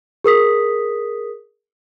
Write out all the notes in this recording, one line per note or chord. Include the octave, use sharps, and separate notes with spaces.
G#4 A#4 D#6 B6